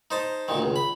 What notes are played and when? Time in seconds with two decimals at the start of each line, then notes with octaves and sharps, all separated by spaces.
0.11 D#4 C5 A5
0.48 D2 A#2 D#3
0.62 C#2
0.76 B5